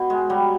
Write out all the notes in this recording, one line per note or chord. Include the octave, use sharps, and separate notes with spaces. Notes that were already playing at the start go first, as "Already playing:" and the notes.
Already playing: B2
G#3
F#3 G3